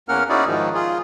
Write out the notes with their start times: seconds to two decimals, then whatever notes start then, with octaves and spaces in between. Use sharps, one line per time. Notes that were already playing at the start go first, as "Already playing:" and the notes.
0.09 E2 A#3 C#4 A#4 F#5 F6
0.29 C#4 D#4 E4 F#4 G#4 D5
0.47 G#2 D#3 F3 D#4
0.74 F4 G#4